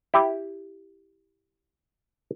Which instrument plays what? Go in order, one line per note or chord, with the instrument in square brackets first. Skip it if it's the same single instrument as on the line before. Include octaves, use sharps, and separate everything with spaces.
[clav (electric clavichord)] E4 G4